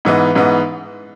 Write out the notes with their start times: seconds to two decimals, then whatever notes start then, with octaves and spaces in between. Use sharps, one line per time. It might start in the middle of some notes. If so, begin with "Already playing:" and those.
0.05 G#2 E3 B3 D#4
0.35 G#2 E3 B3 D#4